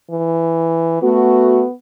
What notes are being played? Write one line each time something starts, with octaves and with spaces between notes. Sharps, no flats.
E3
A3 B3 F#4